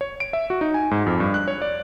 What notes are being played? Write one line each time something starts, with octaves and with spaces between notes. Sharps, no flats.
C#5
D7
E5
F#4
D#4
G#5
G#2
F2
G2
F#6
C#5
D5